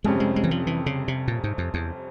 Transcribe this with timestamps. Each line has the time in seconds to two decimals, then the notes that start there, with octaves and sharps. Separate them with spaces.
0.04 F1 F2 C3 G3 G#3 C#4
0.20 G#3
0.36 G#3
0.44 E3
0.51 F3
0.67 E3
0.86 C#3
1.08 C3
1.28 A#2
1.44 G#2
1.58 F2
1.74 E2